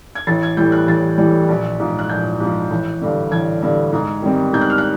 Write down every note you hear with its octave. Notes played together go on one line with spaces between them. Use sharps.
G#6
A1 A6
G#6
A2 E3 G3 G6
F#6
A1 A6
A2 E3 G3
A#1
G#2 F3
F#6
A#1 G6
G#2 F3
A1
G2 D3
A1 G#6
G2 D3
G#2
D#3 G3 C4
G#2 G6
F#6
F6
F#6